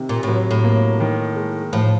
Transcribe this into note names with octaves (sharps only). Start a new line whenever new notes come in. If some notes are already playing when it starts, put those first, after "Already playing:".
Already playing: C3 D#3
A#2
A2 F#3
A2
A#3
D#3
G#3
A2 F3